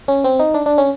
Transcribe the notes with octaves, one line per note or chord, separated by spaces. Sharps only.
C#4
C4
D#4
D4
D4
C#4